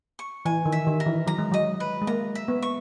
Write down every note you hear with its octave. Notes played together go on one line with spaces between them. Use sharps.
C#6
E3 G#5
D#3
E5
D#3
A#4
E3
F#3 A#5
G#3
F#3 D#5
B4
G#3
A#3 A#5
E5
B3
C#6